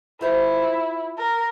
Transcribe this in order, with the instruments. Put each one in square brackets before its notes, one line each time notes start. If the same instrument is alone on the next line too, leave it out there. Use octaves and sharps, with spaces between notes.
[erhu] E4 [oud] F4 C5 E5
[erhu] A#4